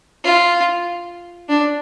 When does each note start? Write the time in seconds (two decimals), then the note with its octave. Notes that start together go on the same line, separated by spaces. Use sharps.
0.25 F4
1.49 D4